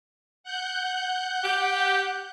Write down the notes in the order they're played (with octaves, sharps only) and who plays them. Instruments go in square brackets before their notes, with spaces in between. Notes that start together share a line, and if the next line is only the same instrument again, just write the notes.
[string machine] F#5 F#6 G6
[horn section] G4